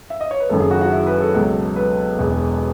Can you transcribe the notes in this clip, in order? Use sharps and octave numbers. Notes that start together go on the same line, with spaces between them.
E5
D#5
C#5
B4
F#1 F#2 D#3 A4
G#4
F#4
F#4
E4
B4
A4
C#2 B2 F#3
B4
E1 E2 B2